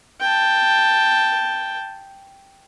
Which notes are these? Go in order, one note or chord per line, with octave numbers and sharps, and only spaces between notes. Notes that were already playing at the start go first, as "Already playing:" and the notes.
G5 A5